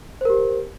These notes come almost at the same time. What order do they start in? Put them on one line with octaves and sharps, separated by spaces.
C5 A#4 G4